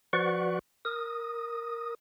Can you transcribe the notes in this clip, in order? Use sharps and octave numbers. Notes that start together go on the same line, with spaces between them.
F3 F#4 B4 D5 F#5 C#6
A#4 D#6